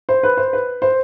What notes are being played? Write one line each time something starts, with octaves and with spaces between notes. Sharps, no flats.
C5
B4
C5
B4
C5